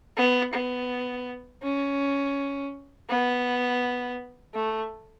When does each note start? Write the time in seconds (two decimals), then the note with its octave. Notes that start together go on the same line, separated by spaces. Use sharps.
0.17 B3
0.53 B3
1.63 C#4
3.09 B3
4.54 A3